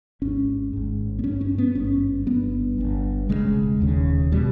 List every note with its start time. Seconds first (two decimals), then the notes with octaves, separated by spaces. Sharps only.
0.22 G#1 G#2 C#4
0.73 G#1 G#2
1.19 B3
1.24 G#1 C#4
1.27 G2
1.41 C#4
1.58 B3
1.75 G#1 G2 C#4
2.26 G1 G2 B3
2.78 G1 G2
3.29 E1 D#2 C#3 G#3
3.80 E1 D#2 C#3
4.32 B2 G3